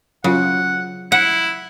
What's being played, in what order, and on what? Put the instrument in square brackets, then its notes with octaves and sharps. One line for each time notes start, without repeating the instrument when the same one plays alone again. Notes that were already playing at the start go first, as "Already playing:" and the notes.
[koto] C#3 [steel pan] F#3 F4 [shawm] F#5
[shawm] E4 [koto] F#5